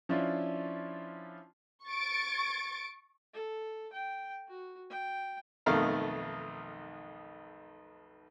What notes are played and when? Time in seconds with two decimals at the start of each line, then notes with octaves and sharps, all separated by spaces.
0.09 F3 C#4 D4 E4 F4
1.86 C#6 A6 D7
3.34 A4
3.93 G5
4.48 F#4
4.90 G5
5.66 B1 F2 D#3 A3 F5 A#5